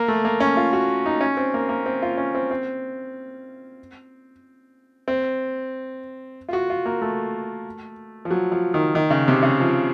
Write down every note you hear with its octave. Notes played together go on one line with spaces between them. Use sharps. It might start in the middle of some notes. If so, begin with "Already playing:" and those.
Already playing: A#3
A3
A#3
C#4
F4
F#4
D#4
C#4
C4
A#3
A#3
C4
F4
C#4
C4
C4
C4
F4
F#4
F4
A#3
A3
F3
F#3
F3
D#3
D#3
C#3
C3
C#3
F3